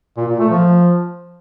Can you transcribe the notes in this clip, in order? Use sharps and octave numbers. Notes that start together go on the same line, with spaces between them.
A#2
A#2
A3
F3